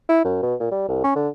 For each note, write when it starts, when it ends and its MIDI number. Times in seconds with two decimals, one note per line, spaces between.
0.09 0.23 64
0.25 0.39 42
0.43 0.55 47
0.60 0.67 46
0.72 0.85 55
0.88 1.01 36
1.04 1.11 61
1.16 1.29 50